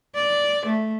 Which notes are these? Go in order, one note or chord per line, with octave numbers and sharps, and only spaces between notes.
D5
A3